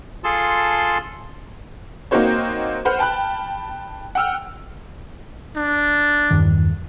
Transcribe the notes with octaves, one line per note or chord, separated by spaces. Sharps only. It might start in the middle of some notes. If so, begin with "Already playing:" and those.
F4 G#4 A4 A5 C6
A#3 C4 D#4 F#4 C5 C#5
B4 C5 F#5 F6
G5 A5 B5 F#6
F#5 G5 E6 F6
D4
E2 G2 D#3